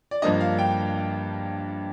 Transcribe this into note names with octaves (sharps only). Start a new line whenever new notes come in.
D5
G2 F3 A#3 D4 D#5
F5
G5